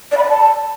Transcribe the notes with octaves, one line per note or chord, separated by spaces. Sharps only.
D5
B5
D5
A5